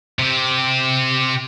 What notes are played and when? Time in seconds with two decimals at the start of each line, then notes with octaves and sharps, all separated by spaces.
0.19 C3 G4